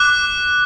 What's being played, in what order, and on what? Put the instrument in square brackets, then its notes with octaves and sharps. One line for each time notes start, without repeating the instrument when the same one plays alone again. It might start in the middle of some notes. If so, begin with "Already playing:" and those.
Already playing: [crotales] D6 F#6